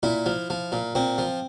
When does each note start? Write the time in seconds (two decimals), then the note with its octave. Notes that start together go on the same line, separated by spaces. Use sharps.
0.03 A#2 E4
0.26 F3
0.50 F3
0.72 A#2
0.95 A#2 C4
1.18 F3